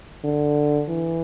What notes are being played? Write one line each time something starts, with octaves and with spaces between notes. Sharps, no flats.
D3
E3